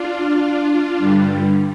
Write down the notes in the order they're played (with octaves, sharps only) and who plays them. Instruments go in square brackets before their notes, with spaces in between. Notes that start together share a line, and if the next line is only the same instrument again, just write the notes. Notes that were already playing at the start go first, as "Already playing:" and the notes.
Already playing: [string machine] D4 F4
G2 D3 G3